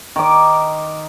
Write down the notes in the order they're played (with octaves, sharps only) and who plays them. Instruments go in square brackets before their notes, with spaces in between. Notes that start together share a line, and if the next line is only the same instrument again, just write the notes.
[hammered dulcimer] D#3 D6